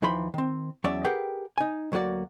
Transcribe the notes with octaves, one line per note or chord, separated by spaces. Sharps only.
D#2 E3 F3 D#4 B5 C6
D#3 C4
E2 F#3 C#4 C#5 D5 E5
G4 G#4 A#4 B4 F#5 G5
D#4 G#5
D2 F#3 A#3 F#4 D5